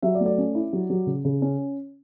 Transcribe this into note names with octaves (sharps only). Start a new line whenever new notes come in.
F#3 E5
D5
A3
D5
C#4
E4
F#3
F#3
C#3
C#3
C#4